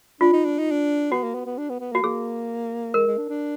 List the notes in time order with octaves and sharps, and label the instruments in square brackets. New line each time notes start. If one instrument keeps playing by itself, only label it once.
[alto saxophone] D4 [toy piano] F4
[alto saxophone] D#4
D4
D#4
D4
[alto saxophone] B3 [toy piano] F#4
[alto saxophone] A#3
B3
B3
D4
B3
B3
A#3
[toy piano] F#4
[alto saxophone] A#3 [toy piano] G#4
[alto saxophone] G#3 [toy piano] A#4
[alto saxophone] G#3
D4
D4